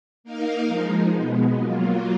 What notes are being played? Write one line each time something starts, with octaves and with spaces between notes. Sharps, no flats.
A#3 D#4 A#4 F5
F3 G#3 D#4
B2 G#3 B3
F#3 A#3 F4